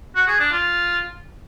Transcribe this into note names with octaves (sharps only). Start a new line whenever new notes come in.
F#4
G#4
D4
F4